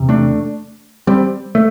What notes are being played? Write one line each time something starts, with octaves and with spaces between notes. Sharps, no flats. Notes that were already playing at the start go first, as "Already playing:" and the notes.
Already playing: E2 C3
A3 D4
G3 C4
A3